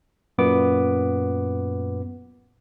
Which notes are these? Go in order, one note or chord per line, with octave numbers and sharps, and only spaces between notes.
F#2 A#2 B3 D6